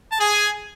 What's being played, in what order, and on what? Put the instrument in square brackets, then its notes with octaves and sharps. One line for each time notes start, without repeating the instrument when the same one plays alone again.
[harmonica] A5
G#4 G#5